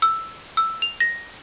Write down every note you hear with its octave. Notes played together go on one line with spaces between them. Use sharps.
E6
E6
F7
A#6